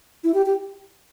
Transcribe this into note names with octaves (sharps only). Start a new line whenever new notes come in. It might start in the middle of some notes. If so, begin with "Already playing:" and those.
E4
G4
G4